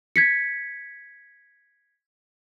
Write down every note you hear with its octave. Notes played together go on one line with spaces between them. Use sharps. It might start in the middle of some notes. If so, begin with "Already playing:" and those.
G#6 B6 C#7